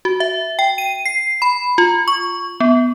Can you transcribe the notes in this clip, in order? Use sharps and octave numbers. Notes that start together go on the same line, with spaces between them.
F#4
E5
G5
D#7
C7
B5
F4
C#6
B3